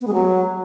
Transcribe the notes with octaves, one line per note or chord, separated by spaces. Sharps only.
B3
G#3
F#3